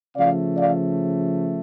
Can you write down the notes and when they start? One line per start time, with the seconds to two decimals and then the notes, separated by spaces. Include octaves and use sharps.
0.17 C#3 F3 A3 D5 F5
0.57 D5 F5